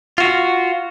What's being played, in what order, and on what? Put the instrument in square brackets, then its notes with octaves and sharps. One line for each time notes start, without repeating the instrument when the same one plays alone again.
[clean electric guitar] F4 F#4